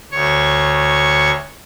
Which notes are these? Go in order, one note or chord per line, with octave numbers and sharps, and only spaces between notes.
D2 C#5 C#6